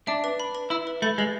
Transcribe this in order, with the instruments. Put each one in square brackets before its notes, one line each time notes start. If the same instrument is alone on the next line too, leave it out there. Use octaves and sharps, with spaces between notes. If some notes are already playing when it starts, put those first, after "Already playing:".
[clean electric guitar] D4 [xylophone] E5
[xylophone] B4
B5
B4
[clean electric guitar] E4 [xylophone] E5
[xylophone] B4
[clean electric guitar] A3 [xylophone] B5
[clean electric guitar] G#3 [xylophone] B4